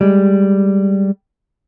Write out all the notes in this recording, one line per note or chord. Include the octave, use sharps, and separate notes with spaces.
G3 G#3